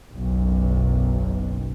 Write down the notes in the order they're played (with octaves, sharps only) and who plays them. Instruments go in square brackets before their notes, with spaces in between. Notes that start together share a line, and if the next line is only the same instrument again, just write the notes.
[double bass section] F#1 B1